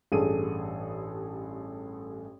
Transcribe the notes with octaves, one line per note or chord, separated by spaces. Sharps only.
A1 G2 G#4 A4 D#7